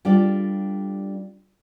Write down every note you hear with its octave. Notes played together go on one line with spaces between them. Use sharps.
G3 D4 F4 G4 A4 D5